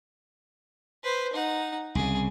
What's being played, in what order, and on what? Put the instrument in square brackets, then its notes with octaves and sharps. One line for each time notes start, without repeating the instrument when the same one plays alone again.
[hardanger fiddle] B4 C5
D#4 F#5
[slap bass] C2 C#3 [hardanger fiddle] G#4